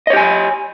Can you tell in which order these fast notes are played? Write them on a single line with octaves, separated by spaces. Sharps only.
D#5 C#5 G4 G#5